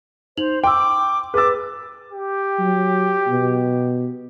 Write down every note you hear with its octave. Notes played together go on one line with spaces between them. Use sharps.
D#4 C5 F7 F#7
G5 C6 D6 E6
G#4 B4 D6 E6 A6
G4
F#3
B2